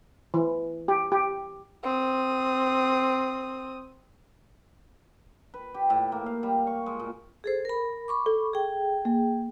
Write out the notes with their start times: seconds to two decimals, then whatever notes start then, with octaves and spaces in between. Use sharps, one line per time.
0.34 E3
0.88 G4
1.12 G4
1.84 C4 D#6
5.54 B4
5.74 G4
5.90 A2
6.12 A#3
6.26 F5
6.43 G3
6.67 C#6
6.86 G#3
6.99 A#2
7.44 G#4 A4 C5
7.65 A#4 B5
8.08 B5 C#6 D6
8.26 A4
8.53 G#4 G5
9.05 A#3